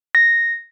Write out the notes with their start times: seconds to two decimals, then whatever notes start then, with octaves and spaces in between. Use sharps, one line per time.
0.15 A#6